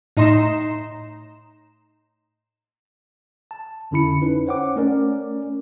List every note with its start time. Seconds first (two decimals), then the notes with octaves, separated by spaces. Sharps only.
0.17 A2 D#4 D#5 A#5 C6 E7
3.51 A5
3.91 F2 D3 C#4 E4 B5 C#7
4.22 C#4 D#4 B4
4.47 C5 C#5 F#5 G5 D6
4.76 A3 C#4 A#4 D5